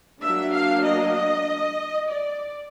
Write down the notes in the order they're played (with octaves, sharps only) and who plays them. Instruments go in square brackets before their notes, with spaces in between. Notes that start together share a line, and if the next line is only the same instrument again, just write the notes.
[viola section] F#3 A#3 D4 E5
F5
D#5
D5